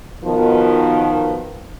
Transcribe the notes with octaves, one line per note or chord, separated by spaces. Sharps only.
B2 D#3 F3